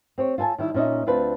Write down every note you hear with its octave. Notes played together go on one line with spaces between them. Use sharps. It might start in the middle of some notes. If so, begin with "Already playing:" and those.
C4 G4 C#5
F4 A4 F#5 G#5 A5
D#3 G3 E4
A#2 C#4 D#4 D#5 E5
D2 C4 D4 F4 B4